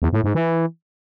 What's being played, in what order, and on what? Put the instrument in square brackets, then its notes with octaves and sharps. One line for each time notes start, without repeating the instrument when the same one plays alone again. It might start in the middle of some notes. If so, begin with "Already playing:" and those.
[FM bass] E2
A2
G#2
E3